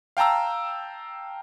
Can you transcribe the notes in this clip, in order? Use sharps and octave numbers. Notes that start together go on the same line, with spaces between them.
F5 G5 A5 A#5 E6